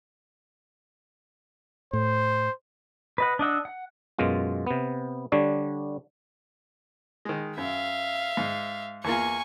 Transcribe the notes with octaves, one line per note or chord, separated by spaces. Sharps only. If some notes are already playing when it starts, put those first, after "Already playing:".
A2 C5
B4 D#5 F#5
D4 D#5 F#5 E6
F#5
F#2 B2 G#3 F4
C3 B3
D3 G3 D4 C#5
D#3 G#3
F#2 E5 F5
G#2
E2 A#3 F4 G#5 C#6